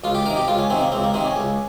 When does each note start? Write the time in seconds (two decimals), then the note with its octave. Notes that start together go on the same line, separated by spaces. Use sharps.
0.04 C#2 F4
0.15 G4
0.26 C3 D#3 A#4
0.37 G4
0.48 C#2 F4
0.59 C#4
0.70 C3 D#3 C4
0.81 A#3
0.92 C#2 C4
1.04 A#3
1.14 C3 D#3 C4
1.26 C#4
1.36 C#2